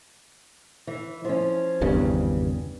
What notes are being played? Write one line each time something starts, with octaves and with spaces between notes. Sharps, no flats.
E3
F3 C#4
G#1 E2 G2 C#3